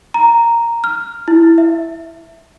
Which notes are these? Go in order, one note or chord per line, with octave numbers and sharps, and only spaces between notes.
A#5
F6
E4
E5